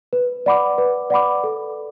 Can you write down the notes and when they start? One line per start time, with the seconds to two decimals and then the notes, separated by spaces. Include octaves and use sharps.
0.13 B4
0.46 D5 F#5 B5 D6
0.78 B4
1.10 D5 F#5 B5 D6
1.44 A4